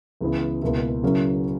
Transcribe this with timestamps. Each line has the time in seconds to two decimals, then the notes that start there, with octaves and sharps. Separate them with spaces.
0.21 C#2 C#3 E3 B3 E4
0.62 C#2 B2 A#3 E4
1.03 C#3 F#3 C#4 E4 A#4